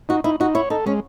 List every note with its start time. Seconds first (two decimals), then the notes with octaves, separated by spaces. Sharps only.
0.09 D#4 F#4
0.24 D#4 E4
0.40 D#4 F#4
0.55 E4 C#5
0.70 D#4 A4
0.86 G#3 C#4